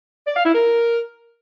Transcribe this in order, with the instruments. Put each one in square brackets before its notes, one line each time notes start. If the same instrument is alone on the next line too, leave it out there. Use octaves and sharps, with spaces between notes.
[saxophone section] D5
F5
E4
A#4